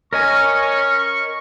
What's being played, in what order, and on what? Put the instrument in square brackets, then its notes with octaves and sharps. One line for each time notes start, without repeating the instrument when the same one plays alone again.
[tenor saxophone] C#4 [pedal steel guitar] A#4 D#5 G#5 [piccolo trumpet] C#6